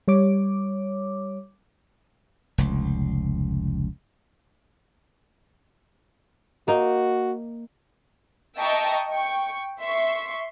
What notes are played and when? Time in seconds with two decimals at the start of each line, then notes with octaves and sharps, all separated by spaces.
0.08 G3 C#5 D6
2.58 F1 C#2
6.68 A#3 D#4 F#4
8.57 D#5 E5 G5 A5 A#5 C#6
9.10 G5 C#6
9.79 E5 C6 C#6